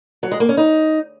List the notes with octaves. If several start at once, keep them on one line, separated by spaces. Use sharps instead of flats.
F#3
G#3
A#3
C#4
D#4